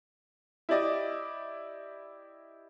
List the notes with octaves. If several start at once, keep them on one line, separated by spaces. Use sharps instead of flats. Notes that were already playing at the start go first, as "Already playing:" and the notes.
E4 G4 D5 D#5